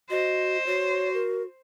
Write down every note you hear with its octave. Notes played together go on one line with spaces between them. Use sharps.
F#4 C5 D#5
F#4 C#5
A#4